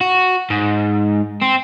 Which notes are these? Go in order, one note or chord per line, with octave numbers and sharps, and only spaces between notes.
F#4
G#2
C4